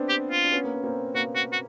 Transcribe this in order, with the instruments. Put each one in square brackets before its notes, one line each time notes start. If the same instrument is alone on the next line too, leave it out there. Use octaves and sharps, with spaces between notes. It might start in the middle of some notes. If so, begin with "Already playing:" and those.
Already playing: [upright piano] B3 C4 D4
[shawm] G4
F4
[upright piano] D4
B3 C#4
A#3
B3
A#3 C4
[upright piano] A#3 C4 [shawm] F#4
[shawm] F#4
F#4